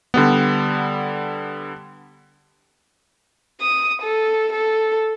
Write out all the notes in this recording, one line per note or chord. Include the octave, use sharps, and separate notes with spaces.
D3 G3 B3
D#6
A4
A4